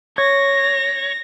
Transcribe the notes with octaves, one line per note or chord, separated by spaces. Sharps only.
C#5 A#6